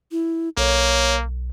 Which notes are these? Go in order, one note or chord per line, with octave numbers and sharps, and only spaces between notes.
E4
B1 A#3 C#5